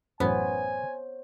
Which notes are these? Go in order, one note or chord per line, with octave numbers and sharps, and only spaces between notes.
A1 F#2 B3 C5 C#5 G#5